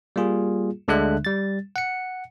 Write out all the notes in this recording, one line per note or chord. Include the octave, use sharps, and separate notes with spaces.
G3 A#3 F4 G#4
D2 D3 G#3 D4 E5 F#6
G3 A6
F#5 C#7